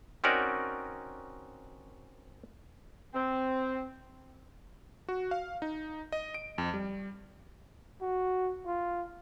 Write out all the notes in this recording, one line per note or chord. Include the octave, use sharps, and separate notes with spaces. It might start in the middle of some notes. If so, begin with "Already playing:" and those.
C4 C#4 D#4 F#4 A#4 D5
C4
F#4
F5
D#4
D#5
D7
F2
G3
F#4
F4